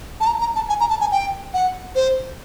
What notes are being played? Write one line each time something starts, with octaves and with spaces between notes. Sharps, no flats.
A5
A#5
A#5
A5
G#5
A#5
A5
G#5
G5
F#5
C5